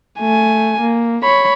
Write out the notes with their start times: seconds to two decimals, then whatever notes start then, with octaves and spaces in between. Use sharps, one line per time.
0.20 A3 G#5
0.81 A#3
1.23 C#5 B5